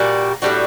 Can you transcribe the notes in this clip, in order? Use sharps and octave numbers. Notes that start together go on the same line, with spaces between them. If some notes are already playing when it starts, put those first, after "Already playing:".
Already playing: A#2 G3 A#3 F#4
A2 G3 D4 F#4